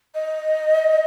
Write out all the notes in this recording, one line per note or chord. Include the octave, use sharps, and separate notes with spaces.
D#5